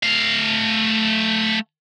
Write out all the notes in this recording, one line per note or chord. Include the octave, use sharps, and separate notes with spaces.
A3 F5